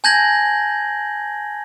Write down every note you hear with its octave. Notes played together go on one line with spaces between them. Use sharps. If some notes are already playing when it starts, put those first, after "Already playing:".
G#5 A5 G6 G#6 A#6 F#7